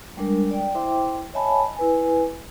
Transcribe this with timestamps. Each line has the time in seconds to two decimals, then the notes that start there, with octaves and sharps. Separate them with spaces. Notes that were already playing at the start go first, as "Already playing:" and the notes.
0.17 G3 G#3 D4 A#4
0.51 D5 G5
0.75 E4 C5 E5 G5 C6 D6
1.34 C#5 D#5 E5 G#5 A5 B5
1.77 E4 B4 G#5